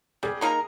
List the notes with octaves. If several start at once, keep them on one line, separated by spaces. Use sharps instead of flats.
G3 G#4
A#3 D#4 A#4